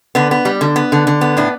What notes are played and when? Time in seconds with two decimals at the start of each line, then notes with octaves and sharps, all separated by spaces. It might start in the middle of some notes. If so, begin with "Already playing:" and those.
0.15 D3 B3
0.31 B3
0.45 G3
0.61 D3
0.76 B3
0.92 D3
1.07 D3
1.21 B3
1.37 A2 D4